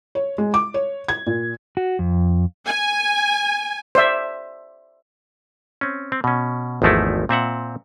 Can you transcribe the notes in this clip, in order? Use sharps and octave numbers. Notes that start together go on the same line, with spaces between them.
C#5
G#3
D6
C#5
G#6
A#2
F#4
F2
G#5
C5 D5 E5
C4 C#4
C4
B2 C#4
G#1 E2 F3 A3 D#4 E4
A#2 C4 E5 F#5